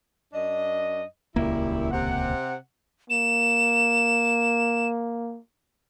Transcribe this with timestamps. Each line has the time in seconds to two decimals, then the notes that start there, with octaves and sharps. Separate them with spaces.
0.33 F#2 D4 D#5
1.36 D#1 C#2 F#2 G3 A#3 E4
1.91 C3 F#5
3.10 A#3 E7